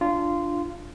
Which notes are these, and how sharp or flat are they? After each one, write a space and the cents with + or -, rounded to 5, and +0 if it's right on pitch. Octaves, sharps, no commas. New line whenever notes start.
D4 +5 F4 -15